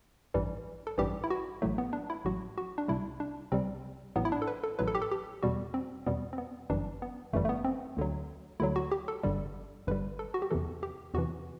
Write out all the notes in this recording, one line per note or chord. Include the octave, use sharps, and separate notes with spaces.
A1 G2 E3 G3
A4
A1 G2 E3 G3 G4
E4
F#4
A1 A2 F#3 A3
B3
D4
E4
A1 A2 F#3 F#4
F#4
D4
C2 C3 G3 E4
D4
C2 C3 G3 C4
A1 A2 F#3 B3
E4
D4
A4
B4
A4
A1 A2 F#3 B4
A4
G4
A4
G4
E2 B2 G3 F#4
C4
E2 B2 G3 B3
C4
B3
G1 F#2 E3 G3 D4
B3
G1 F#2 E3 G3 A3
A3
B3
C4
D2 D3 F#3
D2 D3 F#3 E4
F#4
G4
A4
G1 G2 D3 G3
G1 G2 D3 G3 B4
A4
F#4
G4
E2 C3 E3 A4
G4
E2 C3 E3 F#4